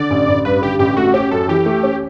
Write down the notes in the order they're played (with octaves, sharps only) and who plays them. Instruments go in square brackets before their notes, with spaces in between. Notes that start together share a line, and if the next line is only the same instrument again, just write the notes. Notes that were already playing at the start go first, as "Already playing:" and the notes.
Already playing: [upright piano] D3 [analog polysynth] D5
[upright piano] A1
A1
[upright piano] G2 [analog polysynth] B4
[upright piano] D3 [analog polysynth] G4
[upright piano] A1 [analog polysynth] G4
[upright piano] A3 [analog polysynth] F#4
[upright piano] C#4 [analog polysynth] G4
[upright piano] F#2 [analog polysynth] A4
[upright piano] E3 [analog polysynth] G4
[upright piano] A3
C#4